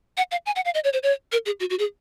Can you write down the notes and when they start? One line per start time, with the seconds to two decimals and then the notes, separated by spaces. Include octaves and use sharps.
0.17 F#5
0.31 F5
0.46 G#5
0.56 F#5
0.65 F5
0.74 D#5
0.84 C#5
0.93 C5
1.03 C#5
1.32 A#4
1.46 G#4
1.60 F#4
1.70 F#4
1.79 G#4